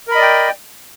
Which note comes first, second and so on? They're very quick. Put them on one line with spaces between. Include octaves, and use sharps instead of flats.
A#4 B5 D#5 D5 G5